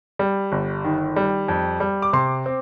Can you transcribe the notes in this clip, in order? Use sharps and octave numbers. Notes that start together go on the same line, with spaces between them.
G3
G1
D#3
G3
F2
G3
D6
C3 C6
C4